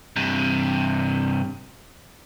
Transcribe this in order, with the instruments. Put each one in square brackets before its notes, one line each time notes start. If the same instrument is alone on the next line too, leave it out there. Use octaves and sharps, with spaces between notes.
[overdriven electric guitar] G2 C3